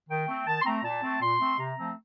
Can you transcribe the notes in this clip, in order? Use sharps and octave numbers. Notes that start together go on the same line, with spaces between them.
D#3 G5
A3 C4
D#3 A5
C6
A3 C4 A#5
A#2 A5
A3 C4
A#2 C6
A3 C4
C3 A#5
F3 A3 C4